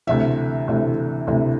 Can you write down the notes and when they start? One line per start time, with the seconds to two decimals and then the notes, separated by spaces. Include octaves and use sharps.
0.07 D2 C3 E3 E5
0.68 D2 C3 E3
1.27 D2 C3 E3